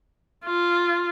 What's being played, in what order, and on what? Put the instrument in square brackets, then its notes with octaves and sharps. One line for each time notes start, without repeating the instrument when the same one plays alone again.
[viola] F4